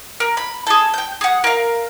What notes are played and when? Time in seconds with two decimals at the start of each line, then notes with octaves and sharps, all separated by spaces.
0.20 A#4
0.37 B5
0.67 G#4 A4
0.94 G5 G6
1.21 G#4 F#5
1.44 A#4 F5